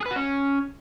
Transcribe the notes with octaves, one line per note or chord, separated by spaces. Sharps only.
G#4
B4
F#4
C#4